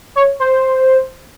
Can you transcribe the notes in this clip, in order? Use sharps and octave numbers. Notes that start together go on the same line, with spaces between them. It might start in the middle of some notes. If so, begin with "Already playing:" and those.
C#5
C5